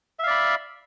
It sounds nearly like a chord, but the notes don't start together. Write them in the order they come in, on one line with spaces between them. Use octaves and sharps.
E5 F5 D5 B5